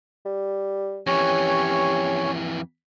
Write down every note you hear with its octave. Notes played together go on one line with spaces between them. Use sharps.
G3
F2 E3 C#4 G4 C#5